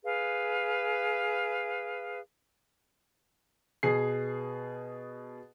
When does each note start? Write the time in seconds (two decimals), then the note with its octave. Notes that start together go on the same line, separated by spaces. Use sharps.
0.03 G#4 B4 F5
3.83 B2 G#4 C7